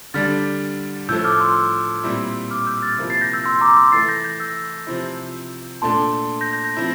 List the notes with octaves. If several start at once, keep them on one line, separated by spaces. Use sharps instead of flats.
D3 G3 D4 F6 A6
A2 F3 A3 E6 G6
D6 F6
C6 E6
A#2 G3 C4 E4
D6 F6
E6 G6
F6 A6
C3 F3 A#3 E4
A6 C7
G6 A#6
E6 G6
C6 E6
A#5 D6
C6 E6
E3 A3 E4 A6 C7
G6 A#6
G6 A#6
E6 G6
C3 F3 C4 E4
A#2 A3 D4 A5 C6
G6 A#6
G6 A#6
G6 A#6
F3 C4 E4